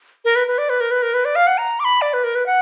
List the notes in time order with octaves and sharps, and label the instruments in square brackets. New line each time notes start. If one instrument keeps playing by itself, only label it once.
[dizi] A#4
B4
B4
D5
B4
A#4
B4
A#4
B4
D5
F5
F#5
A#5
D6
B5
D5
B4
A#4
B4
F#5